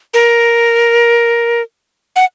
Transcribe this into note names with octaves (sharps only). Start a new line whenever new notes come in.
A#4
F#5